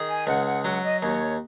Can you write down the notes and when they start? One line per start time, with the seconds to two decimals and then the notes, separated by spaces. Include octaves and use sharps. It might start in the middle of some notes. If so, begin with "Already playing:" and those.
Already playing: D#3 G#4
0.08 G#5
0.27 C#2 F#5
0.46 F#5
0.65 F#3 F#5
0.83 D#5
1.02 D#2 C#5